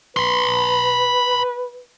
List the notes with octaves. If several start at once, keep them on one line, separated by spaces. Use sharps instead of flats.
B4 B5 C6